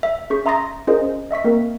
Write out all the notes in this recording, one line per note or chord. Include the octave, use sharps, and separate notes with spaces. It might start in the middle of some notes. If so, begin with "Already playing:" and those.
E5
C#4 G#4 C#6 G6 B6
E5 A#5 C6 D#6 A6 A#6
C#4 F4 G#4 A#4 C5 D#5
D#5 E5 C#6 B6
A#3 C4 A#4